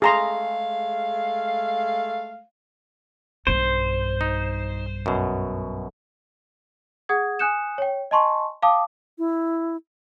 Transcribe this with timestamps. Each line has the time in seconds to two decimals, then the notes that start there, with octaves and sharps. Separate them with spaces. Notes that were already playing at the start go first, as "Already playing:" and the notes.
0.02 G#3 A3 G#4 F5 A#5 C6
3.47 B1 G2 C5
4.21 D#4
5.06 F#2 B2
7.09 G#4 F#5 D#6 G#6
7.39 G#5 D#6 F#6 G6 C#7 E7
7.78 C#5 G5
8.11 D#5 G#5 A5 C6 C#6
8.62 F5 G5 A5 D6 D#6
9.18 E4